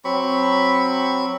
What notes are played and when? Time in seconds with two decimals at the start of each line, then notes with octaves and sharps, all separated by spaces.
0.05 F#3 C4 B5 C#6